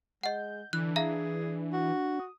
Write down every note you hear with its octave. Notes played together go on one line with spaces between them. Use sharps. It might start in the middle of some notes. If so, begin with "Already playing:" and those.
G#3 D#5 F#5 G6
D3 E3 D4 F#6
G#4 E5 F5 A#5
F#4
D#6